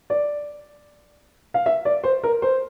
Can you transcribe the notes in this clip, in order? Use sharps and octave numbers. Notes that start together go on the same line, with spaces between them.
D5
F5
E5
D5
C5
A#4
C5